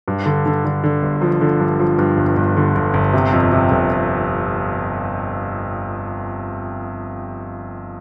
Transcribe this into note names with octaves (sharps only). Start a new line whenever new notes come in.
G2
D3
D3
D3
D3
G1
F3
D3
G2
F3
G2
G1
G1
D3
G1
G1
C3
F2
C3
G1